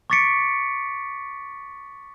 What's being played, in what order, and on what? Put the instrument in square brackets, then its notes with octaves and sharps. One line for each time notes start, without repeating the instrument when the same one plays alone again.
[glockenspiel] C#6 D6 A6 B6 C#7 D7